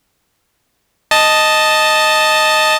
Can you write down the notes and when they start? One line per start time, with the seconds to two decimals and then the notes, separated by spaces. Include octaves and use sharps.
1.11 D#5 A5